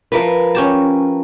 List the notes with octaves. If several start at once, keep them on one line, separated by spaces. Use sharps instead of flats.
F3 A#4 B4
C#4 G4 A5